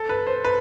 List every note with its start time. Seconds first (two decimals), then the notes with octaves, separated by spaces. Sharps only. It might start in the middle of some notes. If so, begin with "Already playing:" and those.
Already playing: A4
0.09 B4
0.27 C5
0.44 B4